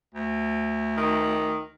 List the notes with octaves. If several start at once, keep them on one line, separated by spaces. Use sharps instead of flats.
D2
D#3